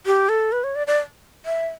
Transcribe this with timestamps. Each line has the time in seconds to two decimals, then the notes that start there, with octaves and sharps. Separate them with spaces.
0.06 G4
0.29 A4
0.52 B4
0.64 C#5
0.75 D5
0.87 D5
1.45 E5